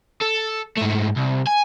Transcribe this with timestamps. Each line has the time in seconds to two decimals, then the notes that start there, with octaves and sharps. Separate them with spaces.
0.22 A4
0.78 G#2 A3
1.17 C2
1.47 G#5